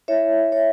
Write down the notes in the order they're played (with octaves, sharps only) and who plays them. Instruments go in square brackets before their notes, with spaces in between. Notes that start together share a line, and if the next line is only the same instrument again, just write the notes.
[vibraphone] E4 C#5 E5
E4 C#5 E5